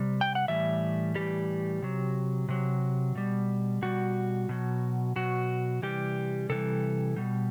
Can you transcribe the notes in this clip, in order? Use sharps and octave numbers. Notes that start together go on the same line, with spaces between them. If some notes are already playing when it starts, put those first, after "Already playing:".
Already playing: C3 G3
G5
F#5
A2 E3 G3 E5
A2 E3 G3 G4
C3 F#3
C3 F#3
B2 G3
B2 G3 F#4
B2 F#3
B2 F#3 F#4
C3 E3 G3 G4
C3 E3 G3 A4
B2 G3